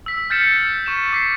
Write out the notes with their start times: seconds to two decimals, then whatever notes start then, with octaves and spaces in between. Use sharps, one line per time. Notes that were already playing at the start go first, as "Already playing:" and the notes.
0.06 E6 B6
0.30 F6 G6 A6 B6 C#7 E7
0.86 C#6 B6 E7
1.13 D6 B6 C7